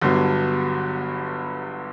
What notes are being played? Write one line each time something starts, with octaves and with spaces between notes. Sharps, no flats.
G1 G2 D3 F#3 B3